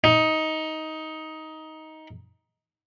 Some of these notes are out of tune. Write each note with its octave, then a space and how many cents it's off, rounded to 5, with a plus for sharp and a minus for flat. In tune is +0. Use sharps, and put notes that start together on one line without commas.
D#4 +15